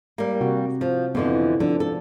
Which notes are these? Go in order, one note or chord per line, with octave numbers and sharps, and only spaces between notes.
G3 A#3
C3 F#4
F3
F2 D3 E3 B3
D3 F3 D4
A4